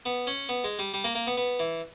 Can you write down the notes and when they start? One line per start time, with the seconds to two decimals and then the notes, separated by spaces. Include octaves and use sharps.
0.06 B3
0.27 C#4
0.49 B3
0.64 G#3
0.79 G3
0.94 G3
1.04 A#3
1.15 A#3
1.27 B3
1.37 B3
1.59 E3